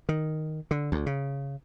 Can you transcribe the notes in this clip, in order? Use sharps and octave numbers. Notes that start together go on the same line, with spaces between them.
D#3
D3
D2
C#3